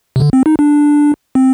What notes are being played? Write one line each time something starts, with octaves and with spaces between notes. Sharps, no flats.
C3
D3
C4
D#4
D4
C4